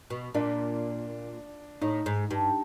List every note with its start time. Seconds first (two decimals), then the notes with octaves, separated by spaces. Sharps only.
0.10 B2
0.34 A#2 D4
1.81 A2 D#4
2.06 G#2
2.31 G2